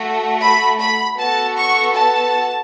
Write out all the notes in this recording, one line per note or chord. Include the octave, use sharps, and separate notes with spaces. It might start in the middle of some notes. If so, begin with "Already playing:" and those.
Already playing: A3 F#4 A4
B5
B5
B3 F#4 A4 A5
C#6
A5